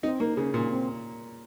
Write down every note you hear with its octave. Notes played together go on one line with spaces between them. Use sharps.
C4 D#4
A#3 D#4
C#3 C#4
A#2 C#4
C4